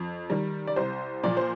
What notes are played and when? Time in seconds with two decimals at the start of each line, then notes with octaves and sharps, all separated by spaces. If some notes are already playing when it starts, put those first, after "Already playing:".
Already playing: F2
0.30 D#3 G3
0.67 D5
0.76 C2 C5
1.24 A#2 F3 D5
1.37 C5